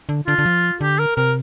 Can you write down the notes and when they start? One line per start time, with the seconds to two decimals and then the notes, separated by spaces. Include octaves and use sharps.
0.09 D3
0.27 D3 F4
0.39 D3
0.46 F3
0.81 D3 G4
0.99 A#4
1.17 C3 A#4